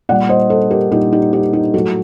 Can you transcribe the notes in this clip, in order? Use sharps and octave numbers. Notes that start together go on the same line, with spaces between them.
A#2 G3 D5 F#5
C5 D#5
A4 C5
G4 A#4
A#2 G3 D#4 G4
D#4 G4
D#4 G4
D#4 G4
A2 F#3 F#4 A4